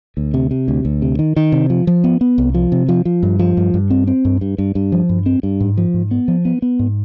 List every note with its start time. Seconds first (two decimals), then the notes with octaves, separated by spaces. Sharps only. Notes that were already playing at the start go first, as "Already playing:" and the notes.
0.17 D2
0.34 C3
0.51 C3
0.68 D2
0.85 D2
1.02 C3
1.19 D#3
1.36 D#3
1.52 C3
1.70 F3
1.87 F3
2.04 B3
2.21 B3
2.38 C2
2.54 F3
2.72 C3
2.89 F3
3.05 F3
3.23 G2
3.39 F3
3.57 G2
3.74 G2
3.90 C4
4.07 C4
4.25 G2
4.41 G2
4.58 G2
4.75 G2
4.92 F3
5.09 G2
5.26 C4
5.43 G2
5.60 G#2
5.77 F3
5.94 G#2
6.11 B3
6.28 F3
6.45 B3
6.62 B3
6.79 G#2